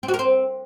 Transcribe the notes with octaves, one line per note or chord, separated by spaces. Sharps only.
C4
F#4
A#4
C4